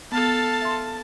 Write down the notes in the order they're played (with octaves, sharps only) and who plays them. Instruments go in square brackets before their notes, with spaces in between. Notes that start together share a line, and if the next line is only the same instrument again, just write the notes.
[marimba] B3 [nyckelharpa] A4 F5 [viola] A5
[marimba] E5 C6